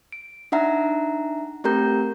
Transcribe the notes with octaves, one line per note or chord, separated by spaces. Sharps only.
D7
D4 D#4 E5 F#5 A#5
A3 C4 G4 A#4 A#5 G6